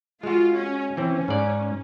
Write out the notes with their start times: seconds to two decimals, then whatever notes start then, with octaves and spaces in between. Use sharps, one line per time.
0.23 G#3 F4 F#4
0.55 C#4
0.97 E3 C4 C#4
1.28 G#2 D5